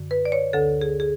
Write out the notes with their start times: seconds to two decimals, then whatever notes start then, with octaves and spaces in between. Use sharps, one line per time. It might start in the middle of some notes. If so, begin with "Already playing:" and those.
Already playing: F#2 D3
0.11 B4
0.25 D5
0.32 C#5
0.53 D2 D3 A4
0.81 G#4
1.00 G#4